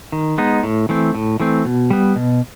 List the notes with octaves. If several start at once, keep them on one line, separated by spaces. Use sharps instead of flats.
D#3
G#3 B3 D#4
A2
E3 A3 C4
A2
E3 A3 C4
B2
G3 B3
B2